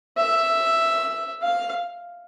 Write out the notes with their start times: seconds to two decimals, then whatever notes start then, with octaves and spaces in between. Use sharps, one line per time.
0.17 E5
1.43 F5